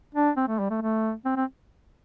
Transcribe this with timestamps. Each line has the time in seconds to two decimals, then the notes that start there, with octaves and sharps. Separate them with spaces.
0.15 D4
0.36 C4
0.48 A3
0.59 G3
0.70 A3
0.81 A3
1.25 C4
1.36 C4